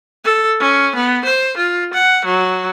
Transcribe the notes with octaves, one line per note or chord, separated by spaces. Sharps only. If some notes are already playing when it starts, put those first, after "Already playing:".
A4
C#4
B3
C5
F4
F#5
F#3